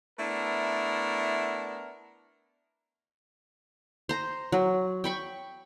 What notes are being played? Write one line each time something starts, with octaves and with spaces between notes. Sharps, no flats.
A3 B3 D4 E4 A#4
C5 A#5
F#3
G5 B5 C#6